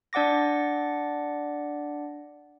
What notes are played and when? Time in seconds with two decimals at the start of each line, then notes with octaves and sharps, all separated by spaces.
0.13 D4 D5 F#5 D6 A#6